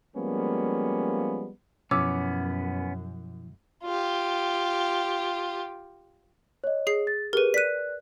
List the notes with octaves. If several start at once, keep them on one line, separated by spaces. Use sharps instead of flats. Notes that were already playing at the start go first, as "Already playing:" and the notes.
F3 G3 G#3 A#3 B3 C#4
F#2 B2 F3 B3 C#4 E4 D6 E6
F4 G4
C#5 D#5
G#4 C7
A6
G4 G#4 A#4 B4 D#7
D5 F#6 B6 D#7